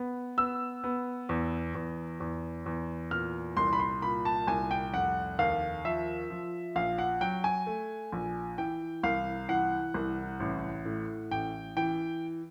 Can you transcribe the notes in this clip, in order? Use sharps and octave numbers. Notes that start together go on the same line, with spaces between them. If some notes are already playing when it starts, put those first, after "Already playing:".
Already playing: B3
B3 E6
B3
E2
E2
E2
E2
A#2 F6
C2 C6
B5
C6
A#2 B5
A5
C2 G#5
G5
F1 F#5
D#2 F5
F3 E5
F3
A#1 F5
F#5
F#3 G5
G#5
A3
A#1
E3 G5
C2 F5
E3 F#5
C2
A1
A2
A1 G5
E3 G5